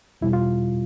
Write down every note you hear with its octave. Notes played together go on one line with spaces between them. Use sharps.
E2 B2 G3 E4
F4